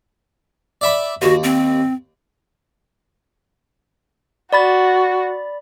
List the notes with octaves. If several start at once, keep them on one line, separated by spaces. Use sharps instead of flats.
D5 E5 B5
D#2 F#4
C4
F#4 D5 B5 A6